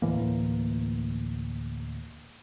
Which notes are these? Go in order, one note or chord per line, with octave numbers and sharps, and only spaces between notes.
D2 A2 E3 A#3